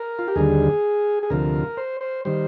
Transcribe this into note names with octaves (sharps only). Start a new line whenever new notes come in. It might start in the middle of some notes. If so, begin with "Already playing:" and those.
Already playing: A#4
F4
G4
D#2 D3 G3 G#4
G#4
D2 C3 F3 A#4
C5
C5
D#3 G3 C5